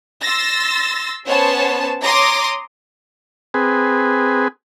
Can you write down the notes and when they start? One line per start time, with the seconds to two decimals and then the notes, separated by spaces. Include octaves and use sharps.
0.21 C6 E6 A6 A#6
1.26 B3 C#4 C5 C#5 A5
2.03 C#5 A#5 C6 D6 D#6 A#6
3.54 C4 G#4 B4